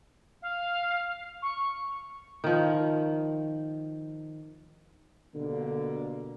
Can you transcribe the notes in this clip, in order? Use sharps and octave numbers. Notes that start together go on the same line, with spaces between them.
F5
C#6
D#3 F3
B2 D3 G3 A#3